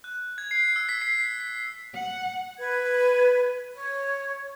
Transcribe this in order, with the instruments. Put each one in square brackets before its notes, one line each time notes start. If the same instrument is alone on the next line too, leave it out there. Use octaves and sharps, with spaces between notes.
[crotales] F#6
G#6
C7
E6
B6
C7
B6
B6
[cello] F#5
[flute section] B4 G#6
C#5